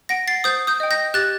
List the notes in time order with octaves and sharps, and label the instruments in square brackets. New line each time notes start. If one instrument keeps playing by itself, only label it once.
[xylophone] F#5 A#6 D7
A6 C7
C5 D#6 G6
D#6 G6
D#5 G5
G6 A#6
G4 F#6 A6